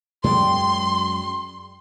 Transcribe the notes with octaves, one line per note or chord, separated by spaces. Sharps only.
F#2 F#3 G#3 G#4 D5 G5 C6